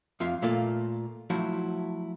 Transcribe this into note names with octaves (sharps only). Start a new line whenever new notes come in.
F2 F4 E5 F5
A#2 A3 A#3 F4
F3 F#3 A3 E4 F#4